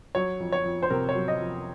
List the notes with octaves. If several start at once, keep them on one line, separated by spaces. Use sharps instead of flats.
F#3 C#5
F2
C#5
F2
C5
C3 A#4
C#5
F#3
D#5
F2